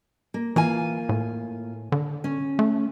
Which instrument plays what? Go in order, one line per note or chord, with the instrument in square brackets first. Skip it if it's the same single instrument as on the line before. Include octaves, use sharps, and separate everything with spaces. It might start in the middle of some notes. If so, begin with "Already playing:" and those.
[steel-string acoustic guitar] A#3
[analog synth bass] E3 [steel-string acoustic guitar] A#3 F4 G#5
[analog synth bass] A2
D3
[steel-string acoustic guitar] C#4
[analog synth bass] A3